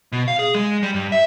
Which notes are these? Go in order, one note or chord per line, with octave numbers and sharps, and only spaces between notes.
B2
F5
G#4
G#3
G3
G2
E5